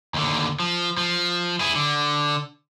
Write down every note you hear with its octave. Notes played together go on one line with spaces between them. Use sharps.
D#2 D3
F3
F3
E4 G#4
D3